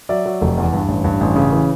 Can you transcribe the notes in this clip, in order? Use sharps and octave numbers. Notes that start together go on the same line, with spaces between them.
F#3 D5 E5
F#3
F1
E2
G2
A1
G2
A1
C#3
E3